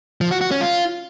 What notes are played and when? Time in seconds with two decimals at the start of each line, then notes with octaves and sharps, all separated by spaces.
0.21 F3
0.31 F#4
0.41 F#4
0.51 C#4
0.61 F4